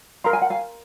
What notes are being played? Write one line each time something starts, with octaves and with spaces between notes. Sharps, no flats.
A#4 F5 A#5 C6
G#5
F#5
F5 G#5